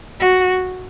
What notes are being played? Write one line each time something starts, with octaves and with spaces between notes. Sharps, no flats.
F#4